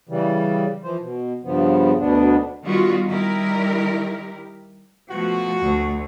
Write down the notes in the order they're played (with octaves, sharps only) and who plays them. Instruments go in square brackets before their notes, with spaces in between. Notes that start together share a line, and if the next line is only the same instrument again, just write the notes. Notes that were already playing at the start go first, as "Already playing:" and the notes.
[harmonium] C#3 E3 G3
E3 F3 C5
B2
G2 C#3 F3 B3
D2 B2 B3 D4
[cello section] D#3 G3 B3 F4 F#4
D#3 G3 E4 G4 A#4
[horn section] B2 B3 F#4 [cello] F3 A3
[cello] D2